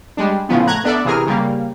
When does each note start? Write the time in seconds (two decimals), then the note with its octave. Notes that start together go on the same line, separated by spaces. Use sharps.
0.17 G3 G#3 D4
0.49 A2 C#3 F3 B3
0.67 A3 A#5 F#6 G#6
0.84 B3 D4 A4 D5 E5
1.05 C3 E3 G#4 A#4 F6
1.27 C#3 G3 A#3